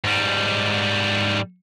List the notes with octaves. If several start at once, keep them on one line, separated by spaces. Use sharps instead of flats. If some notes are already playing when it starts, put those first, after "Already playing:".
G#2 G3